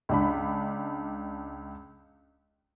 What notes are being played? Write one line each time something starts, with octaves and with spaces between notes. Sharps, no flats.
C#2 D4 B5